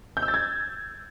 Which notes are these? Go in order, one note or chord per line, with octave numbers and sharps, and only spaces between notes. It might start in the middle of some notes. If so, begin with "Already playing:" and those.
G6
E6
A6
G#6